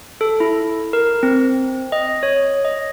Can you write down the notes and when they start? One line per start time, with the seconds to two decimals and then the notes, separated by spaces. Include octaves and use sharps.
0.21 A4
0.40 E4
0.93 A#4
1.23 C4
1.92 D#5
2.23 C#5
2.65 D#5